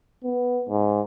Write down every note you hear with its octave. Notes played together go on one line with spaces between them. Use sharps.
B3
G#2